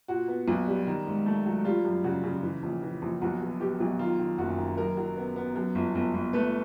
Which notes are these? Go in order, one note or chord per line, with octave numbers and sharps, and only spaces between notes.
A#2 F#4
B3
B1
G3
D#3
G#2
A3
F#3
G3 F4
F#2
C#3 F#4
C#3
E3
A#1
E3
A#1
B1 F#4
B2
B2 G4
B1
D#3 F4
D#3
F#1 F#4
D#3
F#2 A#4
F#3
B3
B3
F#2
G1
G1
G1
A3 B4